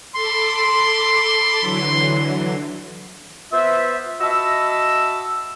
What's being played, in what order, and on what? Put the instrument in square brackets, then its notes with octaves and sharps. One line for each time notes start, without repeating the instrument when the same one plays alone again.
[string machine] A4 B5 D6 [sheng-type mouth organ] C6
[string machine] D3 E3 F#3
[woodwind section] B3 F4 B4 C5 E5
F#4 D#5 E5 A5 B5 E6